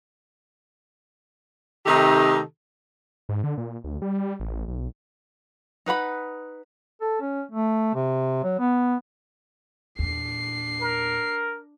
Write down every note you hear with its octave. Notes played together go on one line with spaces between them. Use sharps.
C3 D#3 A3 D#4 G4 A4
G#2
D3
A#2
D2
G3
A1
B1
D#4 B4 F#5 B5
A4
C#4
A3
C3
F#3
B3
E2 A#2 D4 C7
A#4